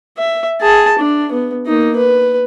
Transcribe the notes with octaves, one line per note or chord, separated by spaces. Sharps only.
E5
G#4 A5
D4
B3
A#3 D#4
B4